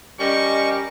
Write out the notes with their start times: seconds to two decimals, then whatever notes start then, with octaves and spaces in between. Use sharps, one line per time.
0.20 G3 C#4 A#4 D#5 C#6